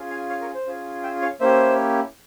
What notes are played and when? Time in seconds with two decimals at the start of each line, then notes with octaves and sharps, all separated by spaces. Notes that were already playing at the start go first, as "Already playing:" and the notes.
Already playing: C#4 F4 G#4
0.10 F5 G#5
0.29 C#5 F5
0.41 A#4 C#5
0.54 C5
0.67 C#4 F4 G#4
1.03 E5 G5
1.22 C#5 F5
1.40 A#3 C#4 E4 G4 C5 E5